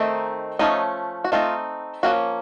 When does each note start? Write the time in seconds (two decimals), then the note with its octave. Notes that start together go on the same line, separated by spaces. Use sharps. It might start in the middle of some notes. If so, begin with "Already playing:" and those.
Already playing: D#3 A3 C4 D#4
0.59 F3 A3 C#4 D#4
1.24 F#4
1.32 A3 C4 D#4 F4
2.03 F3 A#3 C#4 F#4